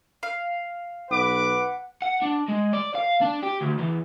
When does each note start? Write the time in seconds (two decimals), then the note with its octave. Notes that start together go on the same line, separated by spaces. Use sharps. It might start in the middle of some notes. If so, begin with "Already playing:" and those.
0.23 F5
1.11 B1 B4 F#5 D6
2.02 F#5
2.22 D4
2.48 G#3
2.73 D5
2.95 F5
3.21 D4
3.43 G4
3.61 D2
3.78 E2